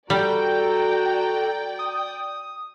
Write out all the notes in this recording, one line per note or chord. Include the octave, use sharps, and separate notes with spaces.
G3 F#4 A4 D5 G5 A#5
D#6